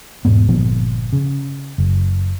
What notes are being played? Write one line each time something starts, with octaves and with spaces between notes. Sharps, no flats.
E1 G#2 B3
G1 A#2 F3 B3
C#3
F#1